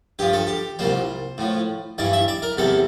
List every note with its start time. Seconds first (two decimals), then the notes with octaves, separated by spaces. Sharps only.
0.19 G2 F3 G4
0.33 A4
0.47 G4
0.79 C2 A#2 G3 C5
1.38 A2 F3
1.98 G2 E3 G3 D5
2.13 E5
2.28 D5
2.42 A#4
2.57 E2 C3 G3 A4